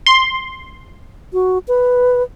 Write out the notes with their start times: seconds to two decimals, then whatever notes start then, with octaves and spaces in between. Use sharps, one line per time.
0.06 C6
1.33 F#4
1.68 B4